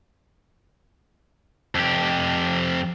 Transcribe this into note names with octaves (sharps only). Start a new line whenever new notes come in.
F2 G4